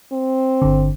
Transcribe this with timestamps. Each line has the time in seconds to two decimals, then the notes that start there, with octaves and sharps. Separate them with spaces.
0.12 C4
0.62 G1 D3